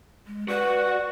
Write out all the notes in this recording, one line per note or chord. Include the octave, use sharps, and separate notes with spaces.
G#3
F#4 B4 D5 F#5